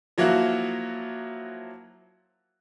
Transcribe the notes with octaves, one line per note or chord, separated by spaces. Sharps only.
F3 F#3 A#3 E4 F#4